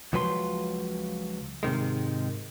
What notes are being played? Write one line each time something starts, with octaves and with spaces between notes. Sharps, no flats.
C#2 F3 F#3 B4 B5 C6
G#2 C3 D#3 G#3